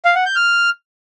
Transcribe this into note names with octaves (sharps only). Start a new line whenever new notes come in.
F5
F#5
G6
F6